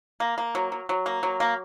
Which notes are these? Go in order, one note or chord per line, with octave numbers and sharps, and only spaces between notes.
A#3
A#3
F#3
F#3
F#3
A#3
F#3
A#3